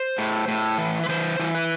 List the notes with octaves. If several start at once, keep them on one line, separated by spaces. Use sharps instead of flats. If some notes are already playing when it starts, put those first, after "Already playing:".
Already playing: C5
A2
A2
E3
B4
E3 C5
E3
B4